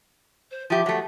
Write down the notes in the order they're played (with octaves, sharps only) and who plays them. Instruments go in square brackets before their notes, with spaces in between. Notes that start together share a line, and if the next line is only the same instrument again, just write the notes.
[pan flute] C5
[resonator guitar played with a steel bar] F3 G4 [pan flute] E5
[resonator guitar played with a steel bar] F#3 A3